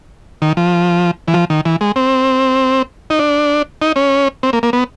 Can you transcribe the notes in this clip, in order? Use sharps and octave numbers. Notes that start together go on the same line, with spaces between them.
D#3
F3
E3
F3
D#3
E3
G#3
C4
D#4
D4
D#4
C#4
C4
A#3
A#3
B3